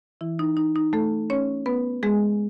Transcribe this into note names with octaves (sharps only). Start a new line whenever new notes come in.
E3 E4
D#4
D#4
D#4
A3 A4
C#4 C#5
B3 B4
G#3 G#4